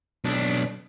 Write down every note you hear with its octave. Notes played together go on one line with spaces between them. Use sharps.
B1 D4